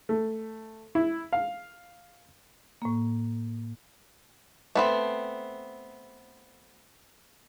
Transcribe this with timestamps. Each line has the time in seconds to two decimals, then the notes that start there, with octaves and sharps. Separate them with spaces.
0.09 A3
0.95 E4
1.33 F5
2.82 A2 A#3
4.75 A3 B3 C4